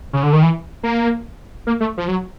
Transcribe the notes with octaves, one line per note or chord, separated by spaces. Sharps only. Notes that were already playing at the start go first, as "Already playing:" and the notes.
C#3
D3
D#3
E3
A#3
A#3
A3
F3
F#3